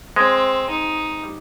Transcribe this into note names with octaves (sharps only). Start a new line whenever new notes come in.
G#3 C4
D#4
G3